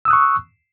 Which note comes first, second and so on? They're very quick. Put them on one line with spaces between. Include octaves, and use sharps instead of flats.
E6 D#6 F#6 C#6